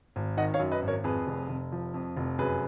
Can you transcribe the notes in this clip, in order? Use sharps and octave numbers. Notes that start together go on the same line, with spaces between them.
G#1
D#3 D#5 F#5
C#5 F5
F#2
B4 D#5
G#1
A#4 C#5
F2 G#4 B4
F1
F1
F3
F2
F1
F#2 G#4 B4